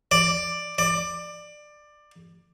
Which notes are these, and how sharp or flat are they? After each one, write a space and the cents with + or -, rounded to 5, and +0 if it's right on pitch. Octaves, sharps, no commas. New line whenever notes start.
D5 +10
D5 +20